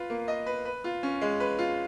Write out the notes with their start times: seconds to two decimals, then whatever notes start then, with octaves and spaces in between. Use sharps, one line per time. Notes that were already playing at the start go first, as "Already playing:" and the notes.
Already playing: F4 B4
0.10 A#3
0.28 D#5
0.46 B4
0.65 B4
0.84 F4
1.03 C#4
1.21 G#3
1.40 B4
1.59 F4